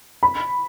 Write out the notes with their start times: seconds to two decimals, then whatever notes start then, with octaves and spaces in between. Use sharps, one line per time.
0.23 B5